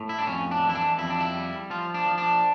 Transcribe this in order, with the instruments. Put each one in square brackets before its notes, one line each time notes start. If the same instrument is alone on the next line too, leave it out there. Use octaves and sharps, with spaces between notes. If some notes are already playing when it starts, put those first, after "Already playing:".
Already playing: [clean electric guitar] A2
E4
D4
F2 C#4
D4
E3
E4
D4
F2 E4
D4
E4
G3
F3 F4
D4
F3
D4